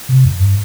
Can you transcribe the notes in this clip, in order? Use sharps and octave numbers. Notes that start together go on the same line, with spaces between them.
C3
F2
G2